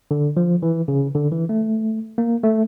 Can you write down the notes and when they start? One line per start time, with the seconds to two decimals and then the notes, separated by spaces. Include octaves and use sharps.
0.11 D3
0.37 F3
0.63 E3
0.88 C#3
1.15 D3
1.32 E3
1.49 A3
2.18 A#3
2.44 A3